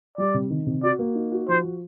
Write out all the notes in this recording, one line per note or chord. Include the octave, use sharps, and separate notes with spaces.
G3 D5
C3
D#3
C3
F#4 D5
A#3
D#4
F#4
F3 C5
F3